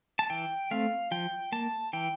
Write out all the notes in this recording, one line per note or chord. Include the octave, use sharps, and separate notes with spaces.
A5
E3 G5
A3 C4 F5
F3 G5
A#3 A5
E3 G5